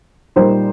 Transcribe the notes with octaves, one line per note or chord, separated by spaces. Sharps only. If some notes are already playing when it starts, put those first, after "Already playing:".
A#2 G3 D#4 C5